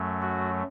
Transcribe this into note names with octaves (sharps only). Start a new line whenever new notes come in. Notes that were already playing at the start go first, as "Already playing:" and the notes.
Already playing: F#2 F#3 A3
F#4